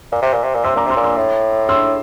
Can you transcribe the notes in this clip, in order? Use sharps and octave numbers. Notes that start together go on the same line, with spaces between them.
A#2
C3
A#2
C3
A#2
C3 C6 E6
A#2 A#5 D6
C3 C6 E6
A#2
C6 E6
A2
C6 E6